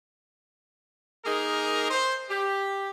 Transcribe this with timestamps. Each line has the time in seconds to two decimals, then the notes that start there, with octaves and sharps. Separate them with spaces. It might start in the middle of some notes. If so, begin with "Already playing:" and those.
1.25 A#3 D#4 G#4 A#4
1.90 C5
2.30 G4